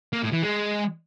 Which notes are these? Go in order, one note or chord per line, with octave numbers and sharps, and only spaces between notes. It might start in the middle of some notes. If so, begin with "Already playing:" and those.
A#3
A2
E3
G#3